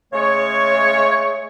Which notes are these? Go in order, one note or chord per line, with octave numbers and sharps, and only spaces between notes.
C#3 G#3 A3 C#5